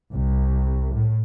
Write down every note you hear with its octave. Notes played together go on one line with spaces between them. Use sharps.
C2
A2